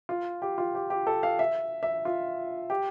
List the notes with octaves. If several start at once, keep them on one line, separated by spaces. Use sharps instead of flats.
F4
G4
F4
G4
G4
A4
F5
E5
E5
F4
G4